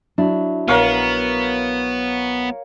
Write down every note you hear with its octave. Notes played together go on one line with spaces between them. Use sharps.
F#3 D4 E4
A#1 B3 A#4 C#5 F5